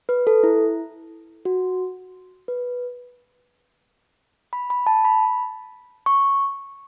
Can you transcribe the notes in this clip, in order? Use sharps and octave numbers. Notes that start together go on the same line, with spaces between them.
B4
A4
E4
F#4
B4
B5
B5
A5
B5
C#6